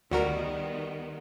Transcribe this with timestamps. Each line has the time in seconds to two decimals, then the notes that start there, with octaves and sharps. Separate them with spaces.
0.12 D2 D#3 G3 B3 F#4 A#4